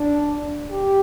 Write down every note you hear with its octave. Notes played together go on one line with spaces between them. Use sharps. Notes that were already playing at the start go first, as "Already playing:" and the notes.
Already playing: D4
G4